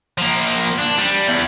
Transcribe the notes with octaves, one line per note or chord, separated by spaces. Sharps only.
F3 A#3
D4
G3
E2